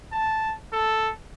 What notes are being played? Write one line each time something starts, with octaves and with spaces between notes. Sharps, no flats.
A5
A4